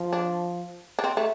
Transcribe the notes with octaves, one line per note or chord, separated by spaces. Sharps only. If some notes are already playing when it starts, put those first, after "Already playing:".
Already playing: F3
D4
D4
C4
A3